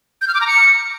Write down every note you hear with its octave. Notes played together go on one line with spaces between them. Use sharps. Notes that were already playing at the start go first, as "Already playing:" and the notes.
G6
F6
D6
A#5
C#7